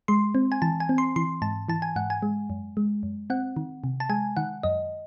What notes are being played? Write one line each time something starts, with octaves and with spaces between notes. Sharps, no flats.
G#3 C6
C4
G#5
E3 A5
G#5
C4
C6
E3 C6
G#2 A5
E3 A5
G#5
G#2 F#5
G#5
G#3
F#2
G#3
F#2
C4 F#5
D#3
C3
A5
G#3 G#5
D#3 F#5
F#2 D#5